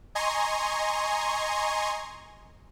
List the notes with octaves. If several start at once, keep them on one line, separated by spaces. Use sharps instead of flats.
D#5 G#5 A#5 C6 C#6